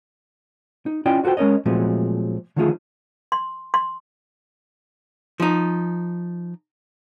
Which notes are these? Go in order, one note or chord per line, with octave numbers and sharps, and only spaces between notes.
D#4
C#4 E4 F4 D5 D#5 G5
F4 F#4 A4 C5 G5
G#3 C#4 A#4 C#5 D#5
A#2 F3 F#3 G#3 A3 C4
D3 D#3 F3 A3 F4 G#4
C6
C6
F3 D#4